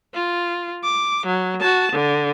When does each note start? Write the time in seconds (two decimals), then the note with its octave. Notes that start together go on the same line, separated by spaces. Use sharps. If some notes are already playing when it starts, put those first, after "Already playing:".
0.15 F4
0.84 D6
1.27 F#3
1.60 F#4 A5
1.92 D3